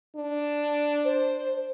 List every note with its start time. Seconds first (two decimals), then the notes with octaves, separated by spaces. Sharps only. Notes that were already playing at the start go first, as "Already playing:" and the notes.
0.16 D4
1.05 C5